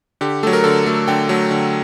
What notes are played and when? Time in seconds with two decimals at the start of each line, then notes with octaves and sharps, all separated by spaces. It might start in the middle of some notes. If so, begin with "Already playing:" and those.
0.21 D3 G4
0.43 F#3 A3 A4
0.53 A#4
0.64 D3 A4
0.86 F#3 A3
1.08 D3 G5
1.29 F#3 A3
1.51 D3